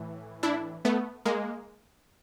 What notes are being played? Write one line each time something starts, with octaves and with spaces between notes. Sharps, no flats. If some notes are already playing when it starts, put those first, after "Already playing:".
Already playing: A2 E3
D4 E4
A3 B3
G#3 A#3